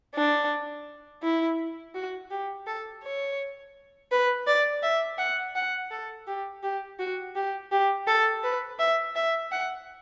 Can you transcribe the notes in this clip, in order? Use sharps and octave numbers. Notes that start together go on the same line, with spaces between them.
D4
E4
F#4
G4
A4
C#5
B4
D5
E5
F#5
F#5
A4
G4
G4
F#4
G4
G4
A4
B4
E5
E5
F#5